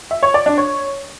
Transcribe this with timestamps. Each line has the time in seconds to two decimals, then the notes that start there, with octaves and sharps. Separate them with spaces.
0.11 E5
0.23 C#5
0.34 D5
0.46 D4
0.58 C#5